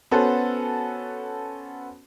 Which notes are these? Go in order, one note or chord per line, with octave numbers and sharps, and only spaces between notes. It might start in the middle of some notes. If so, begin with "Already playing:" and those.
B3 C#4 F#4 A4 C5